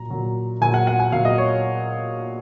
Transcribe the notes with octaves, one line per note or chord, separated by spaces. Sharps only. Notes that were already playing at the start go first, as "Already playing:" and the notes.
Already playing: A#2 F#3 A#5
A#2 F#3
A#2 F#3 G#5
F#5
F#5
G#5
A#2 F#3 F5
D#5
C#5